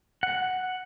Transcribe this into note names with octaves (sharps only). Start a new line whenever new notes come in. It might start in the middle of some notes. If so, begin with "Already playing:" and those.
F#5